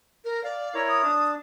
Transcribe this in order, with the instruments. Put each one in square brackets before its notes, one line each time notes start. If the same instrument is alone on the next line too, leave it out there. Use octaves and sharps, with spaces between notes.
[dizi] A#4
[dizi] D5 [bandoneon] F5
[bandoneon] E4 A#4 C#5
[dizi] D#6
[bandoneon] D4 A5